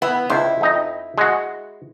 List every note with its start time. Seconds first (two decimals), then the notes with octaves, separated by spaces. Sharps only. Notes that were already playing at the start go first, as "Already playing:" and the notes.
0.02 B3 E4
0.30 C#2 E4 C5
0.61 F2 D#4 A#5
1.18 G#3 F#4